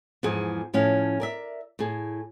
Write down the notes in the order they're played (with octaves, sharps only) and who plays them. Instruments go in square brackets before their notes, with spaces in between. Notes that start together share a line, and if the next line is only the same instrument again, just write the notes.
[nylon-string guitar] E2 G#2 F3 G#4
A2 F3 C#4 E4 F5
A#4 D5 E5
A2 G#4